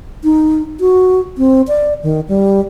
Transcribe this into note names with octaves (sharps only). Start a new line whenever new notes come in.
D#4
F#4
C4
D5
D#3
G3